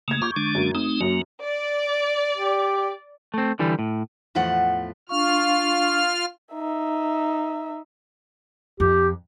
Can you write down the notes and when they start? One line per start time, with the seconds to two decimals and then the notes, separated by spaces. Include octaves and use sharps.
0.08 C#3 A3 A#3 D#6 G#6
0.22 A#3 F4 C#6 D6 G6
0.36 D3 G#3 D4
0.55 F#2 A#3
0.75 A3 C4 D#4 D#6
1.01 F#2 F#3 A#3 C#4
1.42 D5
2.37 G4
3.34 A3 C4
3.59 D3 E3 G3
3.79 A2
4.35 E2 A2 F3 A3 F#5
5.09 D4 F4 F5 C#6 F6
6.54 D#4 E5
8.80 F2 G4